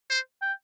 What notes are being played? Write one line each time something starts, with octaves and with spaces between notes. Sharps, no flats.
C5
G5